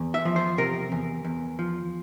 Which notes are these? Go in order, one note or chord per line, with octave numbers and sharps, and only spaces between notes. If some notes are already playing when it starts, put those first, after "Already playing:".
Already playing: E2
E5
F3
C5
C3 A#4
E2
E2
F3